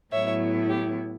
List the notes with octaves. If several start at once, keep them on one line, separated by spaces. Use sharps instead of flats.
A2 F#3 B3 E4 C#5 E5
G4